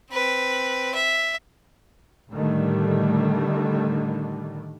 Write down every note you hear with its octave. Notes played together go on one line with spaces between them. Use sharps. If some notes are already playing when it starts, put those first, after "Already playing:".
C4 B4
E5
A2 D3 D#3 G3 A3